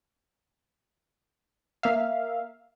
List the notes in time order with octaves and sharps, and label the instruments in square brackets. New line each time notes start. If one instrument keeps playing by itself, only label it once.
[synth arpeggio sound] A#3 E5 F5